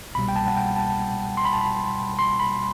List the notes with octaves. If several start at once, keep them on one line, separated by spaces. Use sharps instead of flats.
C2 B2 G3 B5
G5
A5
F#5
G5
A5
C6
B5
A5
B5
C6
B5